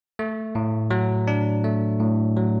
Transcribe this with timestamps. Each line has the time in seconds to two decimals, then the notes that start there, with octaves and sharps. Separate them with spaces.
0.19 A3
0.55 A2
0.91 F#3
1.27 D4
1.64 A3
2.00 A2
2.37 F#3